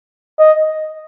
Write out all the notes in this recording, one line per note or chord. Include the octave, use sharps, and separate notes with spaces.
D#5